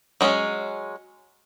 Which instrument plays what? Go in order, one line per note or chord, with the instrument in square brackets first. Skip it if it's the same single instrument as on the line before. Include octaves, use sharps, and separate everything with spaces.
[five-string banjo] F#3 G#3 B3 C#4